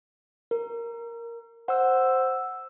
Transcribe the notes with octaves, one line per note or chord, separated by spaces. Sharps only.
A#4
C5 F#5 E6